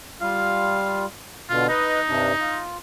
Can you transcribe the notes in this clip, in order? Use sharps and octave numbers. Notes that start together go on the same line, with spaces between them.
G3 F4 F5
B2 D3 F4
D#4 B4 D#5
G2 C3 D4
F4